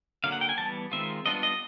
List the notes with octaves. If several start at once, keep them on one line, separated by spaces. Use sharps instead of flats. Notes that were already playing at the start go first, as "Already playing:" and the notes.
D3 F#3 A#3 F5
F#5
G5
G#5
E3 G3 B3 A5
D#3 G#3 C4 F4 E5
G3 B3 D4 F4 D#5
D#5